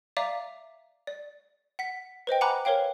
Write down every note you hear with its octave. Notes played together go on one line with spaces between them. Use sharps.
D5 E5 F5 A#5 D6
D5
F#5 B6
B4 C5 D#5 G5
F#5 G#5 A#5 B5 D6 F#6
A#4 B4 C#5 F5 G5